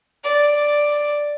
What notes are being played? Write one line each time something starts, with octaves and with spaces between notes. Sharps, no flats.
D5